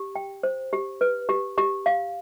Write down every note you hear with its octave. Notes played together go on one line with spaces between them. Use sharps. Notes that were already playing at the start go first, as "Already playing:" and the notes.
Already playing: G4
G5
C5
G4
B4
G4
G4
F5